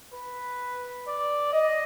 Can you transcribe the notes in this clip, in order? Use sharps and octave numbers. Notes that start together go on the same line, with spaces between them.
B4
D5
D#5